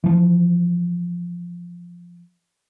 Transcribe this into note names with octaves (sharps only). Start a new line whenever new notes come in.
E3 F3